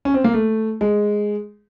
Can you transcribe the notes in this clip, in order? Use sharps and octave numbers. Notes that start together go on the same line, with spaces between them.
C#4
C4
A#3
A3
G#3